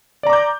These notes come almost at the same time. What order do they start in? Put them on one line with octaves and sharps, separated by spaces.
D5 A#5 D6 G6